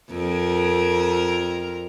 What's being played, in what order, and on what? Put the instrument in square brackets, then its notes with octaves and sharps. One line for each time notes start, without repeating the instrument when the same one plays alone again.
[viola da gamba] F2 A#4